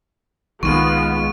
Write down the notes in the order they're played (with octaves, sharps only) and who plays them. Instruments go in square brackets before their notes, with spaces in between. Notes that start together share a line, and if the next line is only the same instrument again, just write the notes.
[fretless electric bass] C2 D#3 [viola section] G#3 B3 F4 [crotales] C#6 D#7